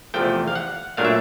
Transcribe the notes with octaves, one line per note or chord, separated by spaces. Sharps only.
E2 C3 F3 A3 G5
F5
F#5
A#2 F#3 A3 D4 F5
E5